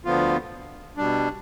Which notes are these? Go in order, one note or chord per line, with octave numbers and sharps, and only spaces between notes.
D2 D3 F3 B3 F4
B2 G3 D4